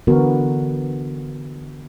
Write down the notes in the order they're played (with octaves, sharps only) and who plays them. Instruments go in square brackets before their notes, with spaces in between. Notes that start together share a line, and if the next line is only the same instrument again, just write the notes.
[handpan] D3 E3 B3 F#4 A#4